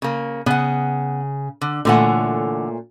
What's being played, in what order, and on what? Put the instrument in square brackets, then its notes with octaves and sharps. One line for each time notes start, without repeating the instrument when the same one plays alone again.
[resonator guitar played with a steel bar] C#3 A#3
[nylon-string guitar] C#3 [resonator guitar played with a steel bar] B3 F#5
[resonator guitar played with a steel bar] D3
[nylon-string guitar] A#2 A3 C#4 [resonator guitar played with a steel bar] D3 E3 F#5